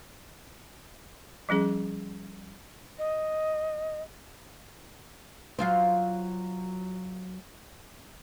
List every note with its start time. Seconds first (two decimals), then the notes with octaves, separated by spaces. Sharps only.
1.49 F3 G3 C#4 G#4
2.99 D#5
5.59 F#3 F4 C5